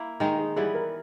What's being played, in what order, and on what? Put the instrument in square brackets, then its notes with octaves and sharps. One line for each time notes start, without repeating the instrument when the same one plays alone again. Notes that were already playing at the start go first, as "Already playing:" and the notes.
Already playing: [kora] A#3 E4
[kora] D#3 G#3 D#4 [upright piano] G5
[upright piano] G#4
[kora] E3 G3 B3 E4 [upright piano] G#4
[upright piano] A#4